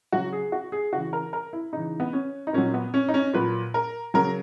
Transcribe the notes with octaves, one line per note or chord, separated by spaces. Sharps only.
C#3 F#3 F#4
G#4
F#4
G#4
C#3 E3 F#4
A#4
A#4
E4
C#3 E3 D#4
B3
C#4
D#4
A#2 F#3 C#4
B3
C#4
D#4
C#4
A#2 F#3 B4
A#4
C#3 F#3 A#4